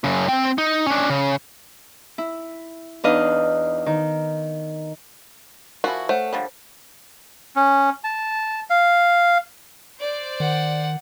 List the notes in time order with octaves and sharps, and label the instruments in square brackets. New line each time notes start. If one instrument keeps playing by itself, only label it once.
[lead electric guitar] F#2 C#3
C4 G5
D#4
C#4 D4
C#3
[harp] E4
E2 D4 D#4 B4 D#5 F5
D#3
[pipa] F3 E4 [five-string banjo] F#4 [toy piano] A#4 G#5
[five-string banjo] A3 [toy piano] C5 C#5 [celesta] F#5
[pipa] D3 F3 G3
[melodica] C#4
A5
F5
[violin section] C5 D5
[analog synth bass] D#3 [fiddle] F#5